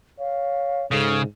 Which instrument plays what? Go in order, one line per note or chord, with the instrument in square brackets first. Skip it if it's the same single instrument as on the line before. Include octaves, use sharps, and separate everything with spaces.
[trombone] C#5 [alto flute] F5
[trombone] G#2 [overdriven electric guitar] C#3 [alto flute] A4